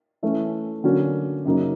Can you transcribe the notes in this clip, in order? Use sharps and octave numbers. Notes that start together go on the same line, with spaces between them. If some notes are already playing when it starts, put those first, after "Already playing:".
E3 A3 C#4
D3 F#3 A#3 C#4 F#4
F#2 C#3 F#3 A#3 D#4